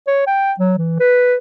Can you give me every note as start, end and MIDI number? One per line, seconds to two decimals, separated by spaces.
0.07 0.24 73
0.27 0.52 79
0.59 0.75 54
0.78 0.98 52
1.00 1.37 71